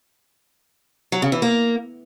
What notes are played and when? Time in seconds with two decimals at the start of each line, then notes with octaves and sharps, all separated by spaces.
1.12 F#3
1.22 C#3
1.32 E3
1.42 A#3